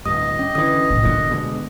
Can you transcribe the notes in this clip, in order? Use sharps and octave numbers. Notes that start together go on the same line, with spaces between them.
D1 G2 D#5 D#6
C#4
D3 E3 D#6
B1 A2 G#3
A#2 D3 E3 B3
B2 D3 G#3